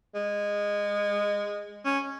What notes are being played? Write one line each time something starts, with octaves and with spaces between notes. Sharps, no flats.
G#3
C#4